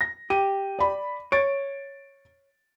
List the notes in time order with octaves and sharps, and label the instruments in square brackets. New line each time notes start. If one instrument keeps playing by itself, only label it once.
[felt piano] A#6
[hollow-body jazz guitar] G4 [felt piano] D#7
[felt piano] D5 B5
[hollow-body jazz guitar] C#5 [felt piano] A6 D7